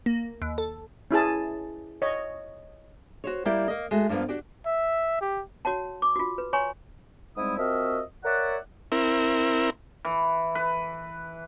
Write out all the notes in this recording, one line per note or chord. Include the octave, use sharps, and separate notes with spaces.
A#3
D#2
A4
C#4 E4 G#4 A5
C#5 D#5
F#4 C5 C#5
G3 A#3 E4 G4 G5
A#3 D#5
G#3 A3 F#4
G2 F3 A#3 B3
D4 F#4 G4 D5
E5
G4
F#4 C#5 F#5 A5
D6
F4 F#4
B4
C#5 G#5 A#5 C6 C#6
G#2 G3 G#3 C4 E4 D#6
F3 C4 F#4 A#4 D#5 E5
A#4 C#5 D5 E5 F#5
C4 E4 A#4
E3
B4